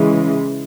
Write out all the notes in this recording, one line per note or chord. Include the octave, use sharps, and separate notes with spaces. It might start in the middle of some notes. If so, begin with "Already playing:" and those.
Already playing: C#3 E3 G#3